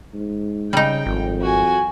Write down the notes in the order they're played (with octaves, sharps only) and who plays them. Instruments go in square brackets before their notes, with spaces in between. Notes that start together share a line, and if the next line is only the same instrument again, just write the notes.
[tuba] G#2
[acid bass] C#3 [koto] G3 D#4 [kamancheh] G5
[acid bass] G#1 [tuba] F2
[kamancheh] F#4 G#5